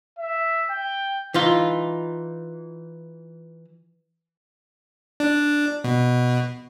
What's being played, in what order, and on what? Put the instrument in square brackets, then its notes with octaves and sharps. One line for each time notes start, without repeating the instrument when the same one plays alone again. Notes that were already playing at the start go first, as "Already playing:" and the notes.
[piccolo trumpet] E5
G5
[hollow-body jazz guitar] E3 D#4 F4
[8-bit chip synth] D4
B2